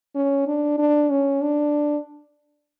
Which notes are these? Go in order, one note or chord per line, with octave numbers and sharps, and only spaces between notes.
C#4
D4
D4
C#4
D4